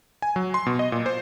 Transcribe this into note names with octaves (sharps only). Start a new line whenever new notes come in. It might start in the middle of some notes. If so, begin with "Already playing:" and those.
G#5
F#3
C6
B2
D#5
A#2
C5